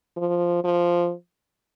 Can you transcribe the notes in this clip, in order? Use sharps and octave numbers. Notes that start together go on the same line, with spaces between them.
F3
F3